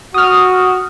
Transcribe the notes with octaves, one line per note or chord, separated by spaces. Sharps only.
F#4 D#6 F6